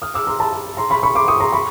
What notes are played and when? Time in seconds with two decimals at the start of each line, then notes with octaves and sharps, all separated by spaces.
0.02 D#6 F6
0.14 D6 E6
0.27 A#5 C6
0.40 A5 B5
0.77 A#5 C6
0.90 B5 C#6
1.03 B5 C#6
1.15 C6 D6
1.28 C#6 D#6
1.40 A#5 C6
1.53 B5 C#6